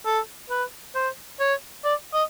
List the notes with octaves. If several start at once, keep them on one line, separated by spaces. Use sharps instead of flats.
A4
B4
C5
C#5
D5
D#5